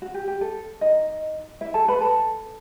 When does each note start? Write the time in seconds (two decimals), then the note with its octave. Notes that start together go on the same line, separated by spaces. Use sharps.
0.02 F#4
0.14 G4
0.28 G4
0.41 A4
0.81 D#4 D#5
1.61 E4 E5
1.74 A4 A5
1.88 B4 B5
2.00 A4 A5